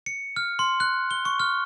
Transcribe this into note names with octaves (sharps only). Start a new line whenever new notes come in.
C#7
F6
C6
F#6
G7
C#6
F6